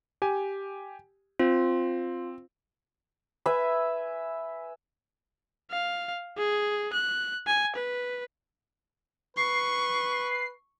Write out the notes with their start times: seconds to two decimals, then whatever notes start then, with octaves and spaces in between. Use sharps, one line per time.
0.22 G4 G#5
1.39 C4 F4
3.46 B4 E5 G#5 B5
5.71 F5
6.38 G#4
6.93 F#6
7.47 G#5
7.76 B4
9.37 B4 C#6 C7